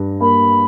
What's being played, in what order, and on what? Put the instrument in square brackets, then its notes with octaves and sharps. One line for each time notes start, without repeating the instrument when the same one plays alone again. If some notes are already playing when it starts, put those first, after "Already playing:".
Already playing: [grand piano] G2 G3
[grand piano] A#3 [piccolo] B5